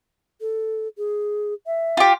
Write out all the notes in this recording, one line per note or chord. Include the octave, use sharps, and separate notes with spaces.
A4
G#4
E5
F4 G4